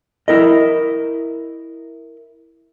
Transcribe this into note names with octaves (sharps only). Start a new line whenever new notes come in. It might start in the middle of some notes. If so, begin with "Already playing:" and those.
E4 A#4 D#5